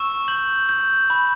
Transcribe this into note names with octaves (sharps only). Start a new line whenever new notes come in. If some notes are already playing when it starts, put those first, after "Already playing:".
Already playing: C#6 E6 E7
G6 F#7
G6
B5